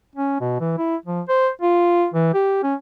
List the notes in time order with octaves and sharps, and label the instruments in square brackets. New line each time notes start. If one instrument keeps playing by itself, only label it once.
[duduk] C#4
B2
E3
E4
F3
C5
F4
E3
G4
C#4